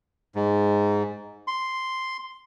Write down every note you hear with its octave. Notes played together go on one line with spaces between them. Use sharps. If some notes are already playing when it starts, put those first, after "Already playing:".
G#2
C6